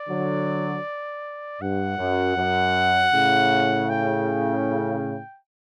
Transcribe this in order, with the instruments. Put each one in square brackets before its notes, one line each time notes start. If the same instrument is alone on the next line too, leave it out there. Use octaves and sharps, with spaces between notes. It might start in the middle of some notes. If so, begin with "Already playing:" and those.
Already playing: [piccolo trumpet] D5
[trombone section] D3 F#3
[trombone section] G2 [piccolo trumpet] F#5
[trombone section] F#2
F#2
A2 C#3
[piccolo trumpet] G5